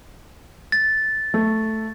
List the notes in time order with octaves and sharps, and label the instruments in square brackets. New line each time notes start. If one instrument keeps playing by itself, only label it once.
[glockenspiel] A6
[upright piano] A3